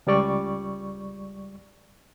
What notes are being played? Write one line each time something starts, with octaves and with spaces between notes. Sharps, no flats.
C#2 G3 D5 C#6